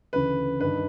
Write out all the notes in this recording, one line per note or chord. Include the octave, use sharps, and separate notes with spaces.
D2 C#3 E3 B4
G2 D#3 B4